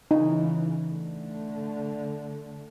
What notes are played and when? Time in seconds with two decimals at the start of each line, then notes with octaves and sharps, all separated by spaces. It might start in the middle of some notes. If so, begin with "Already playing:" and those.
0.11 C#3 E3 D#4
0.91 D3 A3